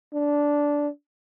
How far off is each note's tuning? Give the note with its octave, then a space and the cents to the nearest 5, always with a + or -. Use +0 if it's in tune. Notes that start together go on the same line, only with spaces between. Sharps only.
D4 -10